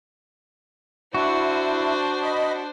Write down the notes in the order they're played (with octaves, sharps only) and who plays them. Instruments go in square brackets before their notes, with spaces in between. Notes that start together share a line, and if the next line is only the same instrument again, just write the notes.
[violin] D4 C5 [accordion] E4 [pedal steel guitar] F#4
[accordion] D#5 B5